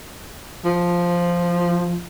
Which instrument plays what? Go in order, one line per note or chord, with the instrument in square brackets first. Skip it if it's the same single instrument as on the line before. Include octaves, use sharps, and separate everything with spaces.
[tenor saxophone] F3